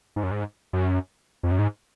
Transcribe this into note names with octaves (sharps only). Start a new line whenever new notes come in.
G#2
F#2
G#2
F#2
F2
F#2
G#2